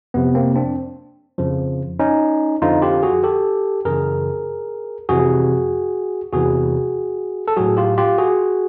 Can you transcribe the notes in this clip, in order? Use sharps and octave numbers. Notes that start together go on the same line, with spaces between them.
F2 C3 F3 B3
A#3 C4
C4 D4
F2 C#3 F3
C#4 D#4
F2 D3 F3 D#4 F4
F4 G4
F#4 G#4
G4 A4
F#2 C#3 E3 G#4 A#4
F2 C3 E3 F#4 G#4
E2 C3 E3 F#4 G#4
A4
A2 F#3 F#4 G#4
F4 G4
F4 G4
F#4 G#4